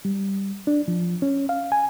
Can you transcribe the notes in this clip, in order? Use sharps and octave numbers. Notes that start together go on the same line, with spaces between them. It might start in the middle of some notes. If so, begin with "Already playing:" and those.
G3
D4
F3
C#4
F5
G#5